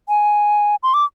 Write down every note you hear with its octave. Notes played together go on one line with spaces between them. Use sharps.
G#5
C6
D6